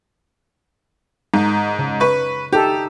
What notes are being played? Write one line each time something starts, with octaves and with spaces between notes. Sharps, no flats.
G#2 D#4
C#3
B4 C#6
D#4 G4 A4